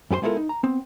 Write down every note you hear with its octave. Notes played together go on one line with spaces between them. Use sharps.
F#2 B3 G4 C5 C6
G#3 B3 E4 F4 A4 A#4
D#4
A#5
B3 C4